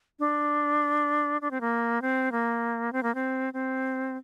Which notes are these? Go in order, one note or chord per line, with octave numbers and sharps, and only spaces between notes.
D4
D4
C4
A#3
C4
A#3
C4
A#3
C4
C4